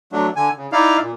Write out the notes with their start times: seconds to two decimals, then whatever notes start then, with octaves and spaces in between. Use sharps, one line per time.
0.13 F#3 A3 D4
0.36 D3 G#5
0.57 C#3
0.72 D#4 E4 D5 F5
1.02 A#2